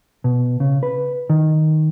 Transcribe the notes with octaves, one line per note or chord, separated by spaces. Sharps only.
B2
C#3
B4
D#3